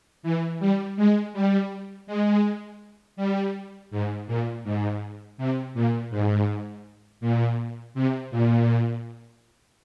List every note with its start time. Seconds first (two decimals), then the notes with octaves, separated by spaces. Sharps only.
0.23 E3
0.60 G3
0.97 G#3
1.33 G3
2.07 G#3
3.17 G3
3.91 G#2
4.27 A#2
4.64 G#2
5.38 C3
5.74 A#2
6.10 G#2
7.21 A#2
7.94 C3
8.31 A#2